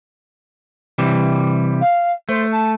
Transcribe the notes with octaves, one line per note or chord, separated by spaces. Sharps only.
C3 E3 G3
F5
A3 C5
A5